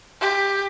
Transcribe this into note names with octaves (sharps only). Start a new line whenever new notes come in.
G4